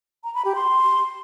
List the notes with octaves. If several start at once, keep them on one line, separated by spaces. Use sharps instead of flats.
A#5
B5
G4
C6